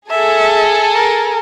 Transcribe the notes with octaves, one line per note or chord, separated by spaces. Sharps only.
G#4 A4 E5
A#4